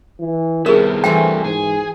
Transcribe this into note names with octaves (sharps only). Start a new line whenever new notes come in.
E3
C2 D#3 B3 E4 G#4 A#4
G2 C3 E3 A3 C4 F#4 C5 G5
G#2 G#4